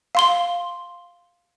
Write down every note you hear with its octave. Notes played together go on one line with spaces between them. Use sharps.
F5 C6 G7